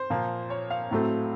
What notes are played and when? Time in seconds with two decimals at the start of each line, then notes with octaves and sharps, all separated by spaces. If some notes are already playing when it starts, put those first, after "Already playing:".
Already playing: C5
0.10 A#2 F3 A#3
0.50 C#5
0.70 F5
0.91 A2 F#3 A3 C4